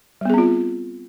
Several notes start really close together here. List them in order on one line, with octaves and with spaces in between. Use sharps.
G3 B3 G#4 C4 F4